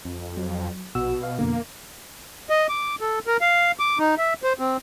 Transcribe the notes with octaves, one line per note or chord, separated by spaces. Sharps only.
F2
F#3
A#1 B2 F#4 E6
F5
F2 B2 D3 A#3
D#5
D6
A4
A#4
F5
D6
D#4
E5
C5
C4